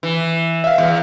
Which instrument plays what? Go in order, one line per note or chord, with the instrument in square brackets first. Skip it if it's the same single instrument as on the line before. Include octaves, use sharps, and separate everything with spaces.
[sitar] E3
[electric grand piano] E5 F5
[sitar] E2